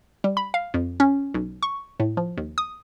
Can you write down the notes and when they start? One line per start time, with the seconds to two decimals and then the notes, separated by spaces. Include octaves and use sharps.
0.24 G3
0.37 B5
0.54 F5
0.74 F2
1.00 C#4
1.34 B1
1.63 C#6
2.00 A2
2.17 F3
2.37 D#2
2.58 D#6